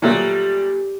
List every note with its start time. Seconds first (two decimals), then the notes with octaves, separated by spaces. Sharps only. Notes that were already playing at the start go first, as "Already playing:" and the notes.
0.02 A#2 F#3 G3 A3